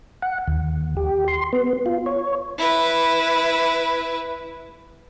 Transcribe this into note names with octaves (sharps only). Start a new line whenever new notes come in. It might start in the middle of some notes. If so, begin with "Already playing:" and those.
F#5
D#2
G4
C6
B3
F4
C#5
E4 B4